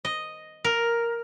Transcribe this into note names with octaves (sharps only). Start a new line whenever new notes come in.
D#5
A#4